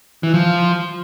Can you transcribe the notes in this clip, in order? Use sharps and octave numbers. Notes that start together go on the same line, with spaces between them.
E3
F3